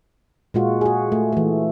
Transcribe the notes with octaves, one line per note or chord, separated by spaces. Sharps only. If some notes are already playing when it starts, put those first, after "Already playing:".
A#2 G#3 F4 F#4
F#4 G#4
A3
E3 A3